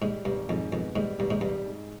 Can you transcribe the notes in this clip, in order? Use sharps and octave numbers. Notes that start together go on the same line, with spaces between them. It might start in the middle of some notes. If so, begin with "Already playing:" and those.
G#2 G3
G#1 G2
F2 G#2
F2 B3
G#2 G3
G#1 G2
G#2
G2 G3
G#2